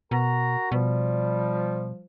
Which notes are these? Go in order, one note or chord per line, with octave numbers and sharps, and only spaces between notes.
B2 F#4 A#4 A#5
B2 F3 G3